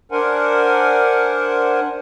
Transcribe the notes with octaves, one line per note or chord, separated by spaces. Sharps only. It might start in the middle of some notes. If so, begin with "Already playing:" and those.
D4 A#4 C5 F#5 G#5